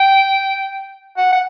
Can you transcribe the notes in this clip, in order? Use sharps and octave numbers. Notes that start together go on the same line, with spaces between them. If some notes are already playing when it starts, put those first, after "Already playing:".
Already playing: G5
F#5
F#5